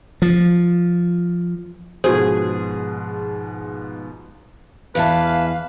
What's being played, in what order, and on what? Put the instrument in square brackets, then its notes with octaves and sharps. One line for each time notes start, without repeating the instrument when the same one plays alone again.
[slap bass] F3
[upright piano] G#2 B2 F3 [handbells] F#4 C5 [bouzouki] G#4
[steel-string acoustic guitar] E2 E3 A5 [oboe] B4 [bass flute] F5